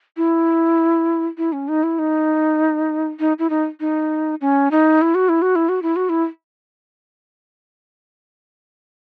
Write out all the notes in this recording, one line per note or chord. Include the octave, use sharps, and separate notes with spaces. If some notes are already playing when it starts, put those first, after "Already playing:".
E4
E4
C#4
D#4
E4
D#4
D#4
E4
D#4
D#4
C#4
D#4
E4
F#4
E4
F#4
E4
F#4
E4
F#4
E4